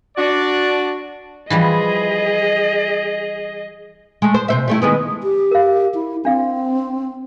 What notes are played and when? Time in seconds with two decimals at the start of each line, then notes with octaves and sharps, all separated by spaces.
0.17 D4 F#4 D5
1.50 E3 F3 G3 G#4 D#5
4.22 G#3 A3
4.34 C5
4.48 C3 C5 E5
4.68 G3 A3 E4
4.82 D#3 G#3 B3
5.23 G4
5.51 A#4 F5
5.95 E4
6.25 C4 D4 F5